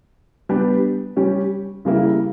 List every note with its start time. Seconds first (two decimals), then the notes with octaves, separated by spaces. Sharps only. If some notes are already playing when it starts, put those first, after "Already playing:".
0.49 G3 B3 D4 G4
1.17 G3 C#4 G4
1.85 C#3 G3 A#3 E4